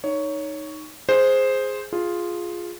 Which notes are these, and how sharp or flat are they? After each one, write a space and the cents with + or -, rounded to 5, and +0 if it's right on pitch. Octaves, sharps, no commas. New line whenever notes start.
D#4 -5 C#5 +10
G#4 +0 C5 +0
F4 +0 G#4 +0